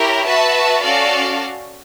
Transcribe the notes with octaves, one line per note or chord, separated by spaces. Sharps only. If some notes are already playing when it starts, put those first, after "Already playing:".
Already playing: E4 G4 A#4 C#5
F#4 B4 E5 A5
C#4 F#4 A4 D5 F5